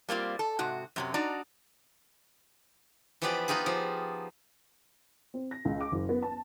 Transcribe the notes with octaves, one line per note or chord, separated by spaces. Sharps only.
G3 A#3 C4 F4
A4
G#2 C3 F#4
F#2 C3 F#3
D4 D#4 F#4 D5 A#5
E3 F3 B3 G4 B4 D5
B3 D#4 F4 G4 G#4
F3
C4
A#6
C#2
D6
F#1
B3
A5